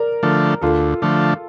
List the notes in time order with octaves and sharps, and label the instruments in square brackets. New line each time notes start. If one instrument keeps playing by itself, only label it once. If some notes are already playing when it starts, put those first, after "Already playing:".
Already playing: [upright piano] A#4 D5
[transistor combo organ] D3 F3 A3
[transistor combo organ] D2 [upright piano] F4 A4
[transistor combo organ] D3 F3 A3